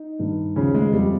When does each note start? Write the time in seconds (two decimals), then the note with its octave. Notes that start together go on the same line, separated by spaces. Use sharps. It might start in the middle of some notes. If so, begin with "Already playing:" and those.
Already playing: D#4
0.19 G2 D#3
0.56 D#2 C#3 F3 C#4
0.75 G#3
0.93 F2 C3 F3 G3